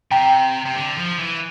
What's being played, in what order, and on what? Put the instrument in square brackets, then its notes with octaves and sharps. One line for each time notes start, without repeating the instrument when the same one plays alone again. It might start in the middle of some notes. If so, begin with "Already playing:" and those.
[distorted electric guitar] C3 [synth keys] G5 A#5
[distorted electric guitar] C3
D3
F3
E3